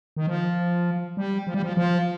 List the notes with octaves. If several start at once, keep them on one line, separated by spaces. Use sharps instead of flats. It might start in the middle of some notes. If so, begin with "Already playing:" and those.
D#3
F3
G3
F3
G3
F3
F3